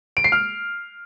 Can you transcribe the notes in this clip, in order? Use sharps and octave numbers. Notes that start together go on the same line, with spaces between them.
D7
C7
F6